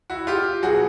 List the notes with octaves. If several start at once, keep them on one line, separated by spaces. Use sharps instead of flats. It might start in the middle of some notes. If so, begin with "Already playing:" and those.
E4 F#4
F4 G4
B2 F#3 F#4 G#4